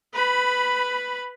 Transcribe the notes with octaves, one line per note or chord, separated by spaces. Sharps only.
B4 B5